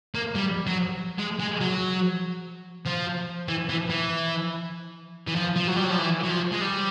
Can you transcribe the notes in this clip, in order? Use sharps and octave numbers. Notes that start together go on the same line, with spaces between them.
A#3
G3
F#3
G#3
G#3
F#3
F3
E3
E3
E3
E3
F3
F3
F#3
G3
F#3
F3
E3
F#3
F3
G#3
G3